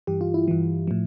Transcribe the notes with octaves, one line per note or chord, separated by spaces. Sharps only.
G2 E3 G4
F4
E4
G2 E3
A2 F3